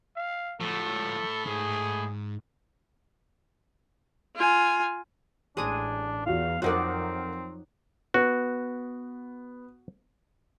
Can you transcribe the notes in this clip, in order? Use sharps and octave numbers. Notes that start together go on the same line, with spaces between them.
F5
A2 F3 A4 C#5
G#2 G#4
F4 G#5
A1 G#3 D4 G#5 A#5
E2 F4 F#4 F5
F2 F#3 C4 D#4 A#4 D5 F#5 F#6
B3 F#4